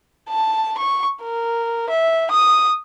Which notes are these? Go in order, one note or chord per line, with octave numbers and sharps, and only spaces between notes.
A5
C#6
A#4
E5
D#6